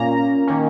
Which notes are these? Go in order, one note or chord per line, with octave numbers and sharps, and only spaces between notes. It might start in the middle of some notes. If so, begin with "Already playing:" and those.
Already playing: A#2 A#3 C#4 A#5
D#3 A#3 C#4